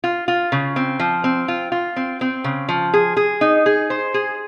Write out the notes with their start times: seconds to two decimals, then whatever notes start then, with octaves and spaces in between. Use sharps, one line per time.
0.04 F4
0.28 F4
0.52 C#3
0.76 C4
0.99 F3
1.24 C4
1.48 F4
1.72 F4
1.96 C4
2.21 C4
2.44 C#3
2.69 F3
2.94 G#4
3.17 G#4
3.41 D#4
3.66 G#4
3.90 C5
4.14 G#4